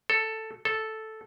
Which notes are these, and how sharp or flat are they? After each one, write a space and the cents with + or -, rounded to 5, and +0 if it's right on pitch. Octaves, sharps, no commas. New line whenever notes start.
A4 +5
A4 -5